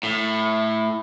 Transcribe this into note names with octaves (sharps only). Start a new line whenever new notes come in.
A2